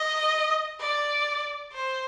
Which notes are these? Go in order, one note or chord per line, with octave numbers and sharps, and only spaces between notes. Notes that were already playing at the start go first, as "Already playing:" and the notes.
Already playing: D#5
D5
C5